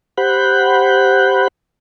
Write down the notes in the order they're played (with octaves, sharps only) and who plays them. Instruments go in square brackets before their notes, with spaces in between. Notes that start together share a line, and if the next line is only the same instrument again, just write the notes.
[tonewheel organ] G4 C5 F#5 B5 F#6 G6